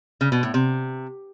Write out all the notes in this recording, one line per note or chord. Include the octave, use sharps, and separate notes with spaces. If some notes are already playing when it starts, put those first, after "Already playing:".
C#3
B2
A2
C3